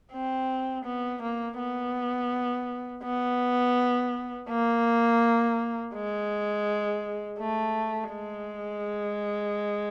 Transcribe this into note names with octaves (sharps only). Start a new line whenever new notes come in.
C4
B3
A#3
B3
B3
A#3
G#3
A3
G#3